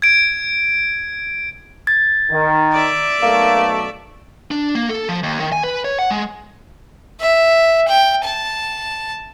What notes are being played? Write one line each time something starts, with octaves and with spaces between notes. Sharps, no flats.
G#6 D7
G#6 A6
D#3
D5 E5
B1 A3 A#3
D4
A#3
A4
F3
D#2
D#3
G#5
B4
C#5
F#5
G#3
E5
G5
A5